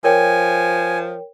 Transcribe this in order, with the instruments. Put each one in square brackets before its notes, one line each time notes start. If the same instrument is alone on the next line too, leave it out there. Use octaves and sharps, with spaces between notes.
[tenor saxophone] F3 [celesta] A#4 C#5 G5 [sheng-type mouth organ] G#5